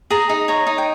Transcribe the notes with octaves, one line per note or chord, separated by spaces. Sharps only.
G#4 A#5
D#4
C#5 A#5
D#4
G5